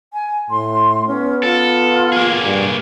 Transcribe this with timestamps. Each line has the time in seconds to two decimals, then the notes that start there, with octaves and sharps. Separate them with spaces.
0.13 G#5
0.50 A2 C6
1.07 B3 C#4
1.43 F4 A4
2.12 A#3 G#4
2.45 G2